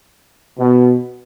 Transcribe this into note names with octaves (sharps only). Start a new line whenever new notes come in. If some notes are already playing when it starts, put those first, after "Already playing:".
B2